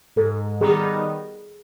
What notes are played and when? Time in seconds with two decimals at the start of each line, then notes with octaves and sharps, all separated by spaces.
0.16 G#2 A4
0.61 D#3 G3 B3 D#4 G#4